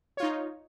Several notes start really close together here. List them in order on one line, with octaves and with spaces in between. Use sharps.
C#5 F4 D#4